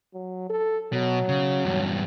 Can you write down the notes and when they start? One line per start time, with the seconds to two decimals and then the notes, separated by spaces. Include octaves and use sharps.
0.14 F#3
0.50 A4
0.93 B2 F#3
1.29 C#3
1.65 E2 G2